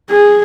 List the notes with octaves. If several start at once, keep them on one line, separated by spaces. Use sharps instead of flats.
G#4